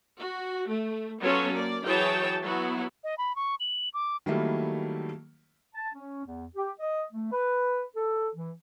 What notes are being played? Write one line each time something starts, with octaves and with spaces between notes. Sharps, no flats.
F#4
A3
F#3 B3 C#4 F4 A4 C#5
A#3 D5
E3 F#3 G#4 C#5 G5 A5
F#3 B3 E4 F#4
D#5
B5
C#6
F#7
D6
D#3 F#3 G3 A3 A#3 E4
A5
C#4
E2
G4
D#5
A3
B4
A4
E3